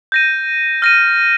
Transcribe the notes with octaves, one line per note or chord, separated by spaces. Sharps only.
G6 A#6 D#7
F6 A#6 D#7